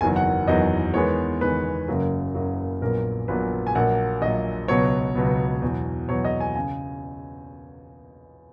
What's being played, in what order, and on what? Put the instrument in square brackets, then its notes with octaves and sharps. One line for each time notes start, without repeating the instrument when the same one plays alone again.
[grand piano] F#1 E2 D#3 F#3 G#5
F#5
F#1 E2 D#3 F#3 D#5
E2 D#3 G#3 B3 C#5
E2 D#3 G#3 B3 B4
F#1 F#2 C#3 F#3 A#3
F#1 F#2 C#3 F#3 A#3
A#1 A#2 F#3 B3 A#4
A#1 A#2 F#3 B3 B4
G#5
A#1 A#2 F#3 A#3 F#5
A#1 A#2 F#3 A#3 D#5
C#2 B2 F#3 B3 C#5
C#2 B2 F#3 B3
E2 B2 F#3
E2 B2 F#3 C#5
D#5
G#5
C#3 G#5